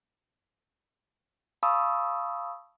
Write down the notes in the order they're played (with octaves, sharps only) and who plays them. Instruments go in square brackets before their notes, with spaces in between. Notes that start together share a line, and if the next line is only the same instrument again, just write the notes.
[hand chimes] F5 A5 B5 C#6 D#6 E6